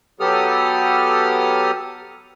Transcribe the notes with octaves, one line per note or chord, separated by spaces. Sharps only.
F#3 B3 G4 A4 D#6 F6